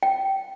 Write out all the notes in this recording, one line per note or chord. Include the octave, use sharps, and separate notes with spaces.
G5